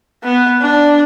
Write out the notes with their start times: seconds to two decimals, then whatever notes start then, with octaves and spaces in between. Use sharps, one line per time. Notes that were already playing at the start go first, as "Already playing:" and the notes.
0.24 B3
0.61 D4